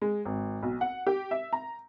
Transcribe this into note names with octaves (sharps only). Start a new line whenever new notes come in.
G#3
G#1
B1
F#5
G4
E5
A#5